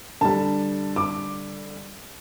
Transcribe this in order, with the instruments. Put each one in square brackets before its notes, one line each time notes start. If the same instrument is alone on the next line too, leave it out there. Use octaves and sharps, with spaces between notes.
[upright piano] D3 G3 A5
D6